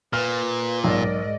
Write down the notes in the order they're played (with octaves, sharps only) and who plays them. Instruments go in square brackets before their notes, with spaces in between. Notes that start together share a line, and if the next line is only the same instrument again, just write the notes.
[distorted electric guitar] A#2 [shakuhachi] B4 [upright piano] F6
[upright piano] B1 [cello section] G#2 D5 D#5 [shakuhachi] A#4